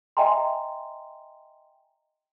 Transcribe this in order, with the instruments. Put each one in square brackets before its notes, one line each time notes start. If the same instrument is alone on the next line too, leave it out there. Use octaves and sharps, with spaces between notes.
[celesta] D#5 E5 G5 G#5 A#5 C6